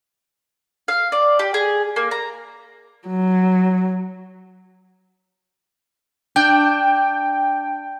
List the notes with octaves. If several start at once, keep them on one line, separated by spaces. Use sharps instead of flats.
F5
D5
G4
G#4
A#3
A#5
F#3
D4 G5 G6